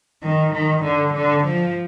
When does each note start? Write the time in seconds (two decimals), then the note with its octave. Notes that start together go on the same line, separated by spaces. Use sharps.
0.23 D#3
0.53 D#3
0.83 D3
1.13 D3
1.43 F3